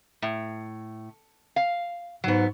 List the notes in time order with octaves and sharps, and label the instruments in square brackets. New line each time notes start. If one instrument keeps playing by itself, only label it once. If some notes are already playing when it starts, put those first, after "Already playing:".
[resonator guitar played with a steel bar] A2
F5
[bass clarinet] G#2 [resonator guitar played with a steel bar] F#3 B3